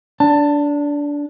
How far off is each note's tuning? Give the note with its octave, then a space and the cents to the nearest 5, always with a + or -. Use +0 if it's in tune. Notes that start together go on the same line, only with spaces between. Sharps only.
D4 -20 A5 +20